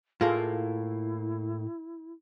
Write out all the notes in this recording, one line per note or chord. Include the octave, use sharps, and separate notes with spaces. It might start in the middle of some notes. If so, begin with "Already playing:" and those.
A2 A#3 E4 F4 G#4 A4